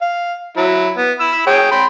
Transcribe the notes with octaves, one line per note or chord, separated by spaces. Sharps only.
F5
F#3 E4
B3
B5 E6
G#4 C#5 G5
G5 B5 C6